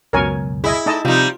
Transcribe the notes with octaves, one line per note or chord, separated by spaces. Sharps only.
C#2 F#2 B2 A#4 C#5 G#5
E4 G#4 D#5
A3 D#4 D5 D#5 A5
C3 F3 G3 D#4 F4